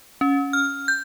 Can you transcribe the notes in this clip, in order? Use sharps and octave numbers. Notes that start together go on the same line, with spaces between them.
C#4
F6
G6